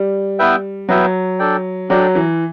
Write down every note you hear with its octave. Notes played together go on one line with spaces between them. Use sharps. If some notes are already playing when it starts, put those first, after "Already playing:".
Already playing: G3
B3 E4 B4 E5 G5
F#3 B3 E4 B4 E5 G5
D4 A4 D5 G5
F#3 D4 A4 D5 G5
E3